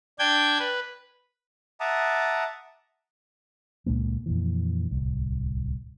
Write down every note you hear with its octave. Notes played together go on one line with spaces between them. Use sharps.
D4 G5 G6 G#6
B4
E5 F#5 A5 A#5 D6 D#6
C#2 A#2 G#3 A#3
F2 A#2 E3
D1 C2